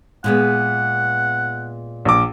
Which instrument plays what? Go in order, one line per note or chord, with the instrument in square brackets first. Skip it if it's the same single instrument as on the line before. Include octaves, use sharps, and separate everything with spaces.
[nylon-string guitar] A#2 G#3 B3 [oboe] F#5
[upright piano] A#1 D6